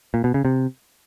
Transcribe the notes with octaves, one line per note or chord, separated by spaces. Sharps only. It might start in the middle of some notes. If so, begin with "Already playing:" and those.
A#2
B2
C#3
C3